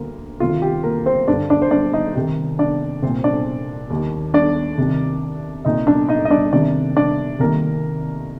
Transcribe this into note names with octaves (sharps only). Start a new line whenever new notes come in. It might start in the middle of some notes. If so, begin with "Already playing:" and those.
Already playing: D2 D3 A#3
D2 C3 D#3 F4
G4
A#3 A#4
C4 C5
G2 D3 D4 D5
D4 D5
C5
D4 D5
D#4 D#5
C2 C3 D#3 G4
D4 D5
C2 A#2 C4 C5
D4 D5
D#2
D#3
D4 D5
C2 C3 D#3
C2 A#2 D#4 D#5
D4 D5
D#4 D#5
D#5
D4 D5
C2 C3 D#3 D4 D5
D4 D5
C2 C3 D#3 A#3 A#4